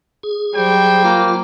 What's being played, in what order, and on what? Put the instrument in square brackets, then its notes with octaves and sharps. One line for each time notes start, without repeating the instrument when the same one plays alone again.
[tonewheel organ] G#4
[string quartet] F#3 G3 C5 [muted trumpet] G5
[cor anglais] A#3 [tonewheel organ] F4